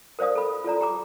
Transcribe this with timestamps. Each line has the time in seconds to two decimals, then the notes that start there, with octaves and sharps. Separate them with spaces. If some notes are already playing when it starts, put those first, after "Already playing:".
0.19 A#4 C5 D5 F5 D#6
0.35 A4 B5
0.64 F4 A4 D5 A#5
0.81 G4 A#5 D6